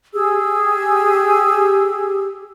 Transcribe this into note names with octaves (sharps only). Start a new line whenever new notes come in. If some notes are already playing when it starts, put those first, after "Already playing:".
G4 G#4 E6